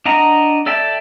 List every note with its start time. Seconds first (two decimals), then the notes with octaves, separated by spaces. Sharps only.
0.06 D4 D#5 F#5 A#5
0.66 A4 D5 E5 G5 A5